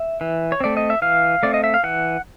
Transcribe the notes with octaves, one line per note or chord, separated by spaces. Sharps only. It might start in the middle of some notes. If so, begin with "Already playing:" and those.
Already playing: E5
E3
C#5
A3 C4 D5
D#5
E5
E3 F5
A3 C4 D5
D#5
E5
F5
E3 F#5